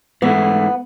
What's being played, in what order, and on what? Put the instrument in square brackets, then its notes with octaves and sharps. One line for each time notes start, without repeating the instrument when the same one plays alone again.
[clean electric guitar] G#2 E3 A3 [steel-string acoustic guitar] B3